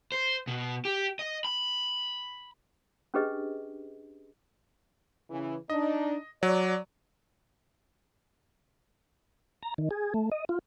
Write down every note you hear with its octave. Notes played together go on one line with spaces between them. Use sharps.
C5
B2
G4
D#5
B5
C#4 D4 G4 G#4 B4 D#5
C#3 E3
D4 D#4 D#5
F#3 D5
A#5
D#3
G#4
A3
D#5
F4